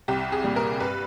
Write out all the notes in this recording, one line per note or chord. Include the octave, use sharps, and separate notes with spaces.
C2 G4
G#4
A#2 G3
A#4
G2 B4